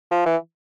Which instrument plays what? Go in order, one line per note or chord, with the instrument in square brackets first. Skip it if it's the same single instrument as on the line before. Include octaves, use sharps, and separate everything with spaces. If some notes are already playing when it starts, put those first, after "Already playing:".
[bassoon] F3
E3